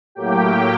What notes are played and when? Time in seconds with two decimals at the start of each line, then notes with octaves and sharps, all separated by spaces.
0.15 A2 F#3 A#3 G4 G5